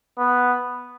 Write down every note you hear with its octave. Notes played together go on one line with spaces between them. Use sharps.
B3